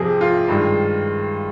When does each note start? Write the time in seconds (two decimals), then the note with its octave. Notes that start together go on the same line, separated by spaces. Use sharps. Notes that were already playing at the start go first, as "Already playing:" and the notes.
Already playing: F2 C3 F3 G#4
0.21 F4
0.48 G2 D#3 G#3